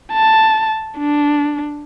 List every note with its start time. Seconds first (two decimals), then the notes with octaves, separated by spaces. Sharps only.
0.13 A5
0.98 D4